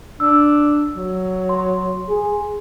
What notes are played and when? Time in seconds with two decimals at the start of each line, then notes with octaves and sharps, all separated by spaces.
0.20 D4 E6
0.93 F#3
1.49 C6
2.09 G#4